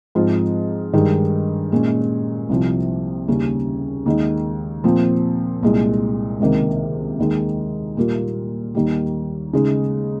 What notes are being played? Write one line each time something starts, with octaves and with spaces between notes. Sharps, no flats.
G#2 F3 C4 F4
G2 D#3 G#3 D#4
A#2 G#3 C#4
C2 C3 F3
D#2 C#3 G3 C#4
D#2 D#3 G#3 D#4
A#2 F3 C4
C2 A#2 G#3
C#2 C3 D#3 A#3
D#2 D#3 G#3
A#2 G3 A#3 F4
D#2 D#3 G3
C#3 G#3 D#4